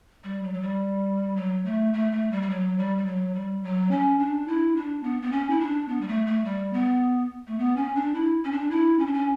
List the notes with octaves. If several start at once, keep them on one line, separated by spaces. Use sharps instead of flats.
G3
F#3
F#3
G3
F#3
A3
A3
A3
G3
G3
F#3
G3
G3
F#3
G3
F#3
C#4
D4
E4
D4
B3
B3
C#4
E4
D4
B3
G3
A3
A3
G3
B3
A3
B3
C#4
D4
E4
C#4
D4
E4
C#4
D4
C#4